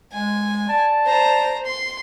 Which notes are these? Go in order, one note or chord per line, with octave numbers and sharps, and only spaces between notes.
G#3 G#5
D5 A5
C5 A#5
C6